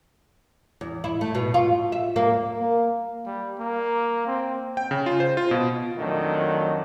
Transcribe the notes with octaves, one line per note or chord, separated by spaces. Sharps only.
E2
E4
A3
B2
F4
E5
A#3
A#3
G3
A#3
C4
G5
C#3
F4
C5
F4
B2
F2 D#3 F#3 A3 D4